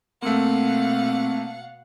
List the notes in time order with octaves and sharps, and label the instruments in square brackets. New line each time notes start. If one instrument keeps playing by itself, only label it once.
[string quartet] B2 F5 F#5 [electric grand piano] A3 A#3 [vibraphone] C4 E6